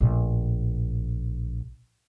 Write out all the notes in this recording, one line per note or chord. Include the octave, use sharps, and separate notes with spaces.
A#1 A2